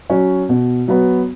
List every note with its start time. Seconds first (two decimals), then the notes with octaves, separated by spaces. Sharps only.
0.10 F#3 C#4
0.49 B2
0.88 F#3 B3